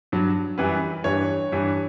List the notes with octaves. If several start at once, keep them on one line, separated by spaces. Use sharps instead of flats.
G2 F#3
F#2 E3 G3 B4
G2 E3 G3 C#5
G2 E3 G3